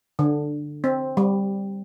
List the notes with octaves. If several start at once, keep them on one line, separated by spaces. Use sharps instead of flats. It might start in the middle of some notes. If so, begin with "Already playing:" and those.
D3
C4
G3